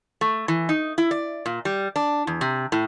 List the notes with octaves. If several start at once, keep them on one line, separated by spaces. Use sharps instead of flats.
A3
E3
D#4
E4
D5
A#2
G3
D4
E2
C3
A2